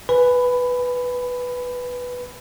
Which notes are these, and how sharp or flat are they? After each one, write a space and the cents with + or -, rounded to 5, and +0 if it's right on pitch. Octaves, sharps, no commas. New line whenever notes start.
B4 +0 G#5 +0 B5 +15